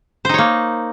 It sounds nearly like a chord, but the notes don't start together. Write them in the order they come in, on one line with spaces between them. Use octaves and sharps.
C5 D#4 C#5 A#3